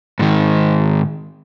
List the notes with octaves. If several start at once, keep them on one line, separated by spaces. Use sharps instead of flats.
G#2 D#3